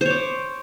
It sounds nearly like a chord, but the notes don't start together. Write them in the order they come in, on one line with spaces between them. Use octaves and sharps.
C5 C#5 D6